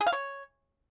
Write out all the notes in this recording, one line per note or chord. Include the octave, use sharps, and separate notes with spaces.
G#4
F5
C#5